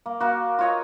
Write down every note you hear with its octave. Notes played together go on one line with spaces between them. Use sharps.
A#3
A#3 F#4
F4 C#5 D#5